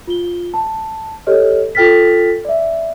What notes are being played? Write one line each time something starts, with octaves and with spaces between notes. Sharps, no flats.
F4 G7
A5
G4 A4 C#5 D#5 F6
F4 A4 G5 F6 A6 B6
D5 E5